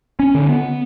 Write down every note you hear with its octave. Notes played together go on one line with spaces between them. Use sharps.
C#4
D3
B3